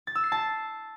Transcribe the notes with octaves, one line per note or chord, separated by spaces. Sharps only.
A6
E6
C7
A5